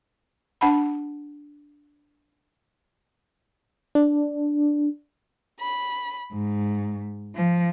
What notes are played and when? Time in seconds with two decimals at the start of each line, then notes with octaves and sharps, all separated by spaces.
0.61 D4 F#5 A5 B5
3.95 D4
5.60 B5
6.31 G#2
7.36 F3